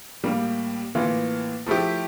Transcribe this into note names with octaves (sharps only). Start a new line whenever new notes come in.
A2 G3 A#3
A2 E3 A#3 F4
F3 A3 E4 G4